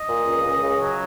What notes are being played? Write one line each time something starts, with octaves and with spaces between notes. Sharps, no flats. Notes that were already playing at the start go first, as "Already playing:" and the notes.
Already playing: D#5
A#2
C#2
C#2
C#3
F#3